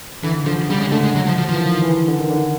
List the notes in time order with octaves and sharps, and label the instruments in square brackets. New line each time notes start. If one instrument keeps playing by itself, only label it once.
[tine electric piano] D3 [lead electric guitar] E3
[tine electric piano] D3 [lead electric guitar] F3
[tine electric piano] C#3 [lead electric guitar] G3
[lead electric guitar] G#3
[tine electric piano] D3 [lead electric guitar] A3
[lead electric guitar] G#3
F#3
F3
F3
[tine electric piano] E3 [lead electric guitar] F3
[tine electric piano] D#3
E3
D3
D#3
D3